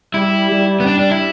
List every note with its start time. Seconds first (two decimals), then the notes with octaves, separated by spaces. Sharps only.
0.14 G3 E4
0.51 G3
0.80 B3
0.86 D4
1.00 D4
1.11 E4